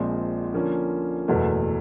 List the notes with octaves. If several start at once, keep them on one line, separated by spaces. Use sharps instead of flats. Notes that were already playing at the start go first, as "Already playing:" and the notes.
Already playing: A#1 A#2 F3 G#3 C4
D3 F3 A#3 C#4
F#1 E2 B2 F#3 A3